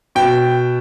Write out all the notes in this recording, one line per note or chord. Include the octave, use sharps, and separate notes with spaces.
B2 G5